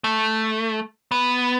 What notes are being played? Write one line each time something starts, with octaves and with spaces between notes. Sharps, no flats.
A3
B3